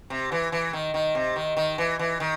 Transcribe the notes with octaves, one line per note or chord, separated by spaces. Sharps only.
C3
E3
E3
D#3
D#3
C3
D#3
D#3
E3
E3
D#3